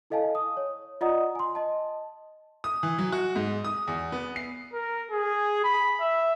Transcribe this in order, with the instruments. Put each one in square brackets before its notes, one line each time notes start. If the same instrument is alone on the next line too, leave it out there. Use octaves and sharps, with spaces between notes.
[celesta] E4 A4 D#5 F5 G#5 A5
D#6
C#5
F4 D5 D#5 F#5 A#5 D#6
G#5 C6
D#5 A5
[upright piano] D#6
E3
F#3
F#4
G#2
D#6
E2
B3
C7
[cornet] A#4
G#4
B5
E5